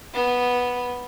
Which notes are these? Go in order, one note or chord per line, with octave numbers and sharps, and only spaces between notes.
B3